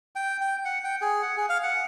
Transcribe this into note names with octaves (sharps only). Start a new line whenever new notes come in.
G5
G5
F#5
G5
G#4
F#5
G#4
F5
F#5